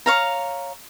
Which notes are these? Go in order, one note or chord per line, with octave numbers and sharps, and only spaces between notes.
C#5 F5 A#5